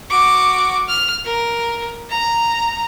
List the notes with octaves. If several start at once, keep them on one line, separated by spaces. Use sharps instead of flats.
F#4 D6
F6
A#4
A#5